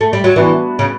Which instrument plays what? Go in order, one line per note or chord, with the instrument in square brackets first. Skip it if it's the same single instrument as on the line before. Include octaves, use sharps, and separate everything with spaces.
[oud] A3
G3
F#3
[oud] E3 [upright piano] B3 D4 F#4 B4 D5
[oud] C#3